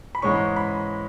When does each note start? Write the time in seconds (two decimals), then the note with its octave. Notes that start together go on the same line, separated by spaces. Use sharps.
0.15 B5
0.22 G#2 E3 G#3 C#4 C#6
0.56 B5